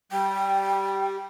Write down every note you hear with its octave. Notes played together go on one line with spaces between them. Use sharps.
G3 G5